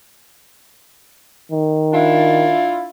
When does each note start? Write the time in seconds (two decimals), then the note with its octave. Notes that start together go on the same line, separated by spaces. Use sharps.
1.52 D#3
1.93 D4 E4 F4